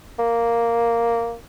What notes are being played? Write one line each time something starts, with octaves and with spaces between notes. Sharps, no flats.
A#3